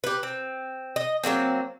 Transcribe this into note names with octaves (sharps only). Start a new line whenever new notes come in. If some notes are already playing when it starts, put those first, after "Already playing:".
G4 B4
C4
D#5
F#3 G#3 A#3 C4